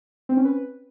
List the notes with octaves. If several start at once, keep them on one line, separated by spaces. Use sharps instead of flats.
C4
C#4
B4